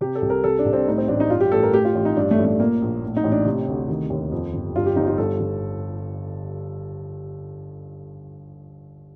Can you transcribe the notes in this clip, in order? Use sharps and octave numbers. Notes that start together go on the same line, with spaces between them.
C3 G4
A4
C2
A#4
C3 A4
D4
C2
C4
A2 D#4
C4
A1 D4
D#4
G2 F4
G4
A1 A4
A#4
A2 G4
F4
A1
D#4
G2 D4
A3
A1
A3
A#2 A#3
A#1
A2
D#4
A1
D4
C3
D2
D#3
D#2
F2
G1
G2 F4
G4
G1 D#4
F4
G2 A4
G1